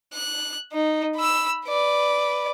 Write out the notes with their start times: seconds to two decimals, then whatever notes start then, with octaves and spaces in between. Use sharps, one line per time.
0.13 F#6
0.73 D#4
1.16 B5 E6
1.66 B4 D5